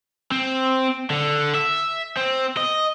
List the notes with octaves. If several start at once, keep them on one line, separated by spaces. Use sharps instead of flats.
C4
D3
E5
C4
D#5